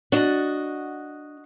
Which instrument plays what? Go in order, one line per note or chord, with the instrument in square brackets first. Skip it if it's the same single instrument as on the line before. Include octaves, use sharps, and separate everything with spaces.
[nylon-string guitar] D4 [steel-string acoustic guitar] F#4 D#5